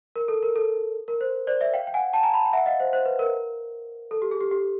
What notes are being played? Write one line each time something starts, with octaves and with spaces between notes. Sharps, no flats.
A#4
A4
A#4
A4
A#4
C5
C5 D5
D5 E5
F5 G5
G5
F#5 G#5
G5 A5
G#5 A#5
A5 B5
G5
E5 F#5
D#5 F5
C5
C5
B4
A#4
A4
G4
G#4
G4
G4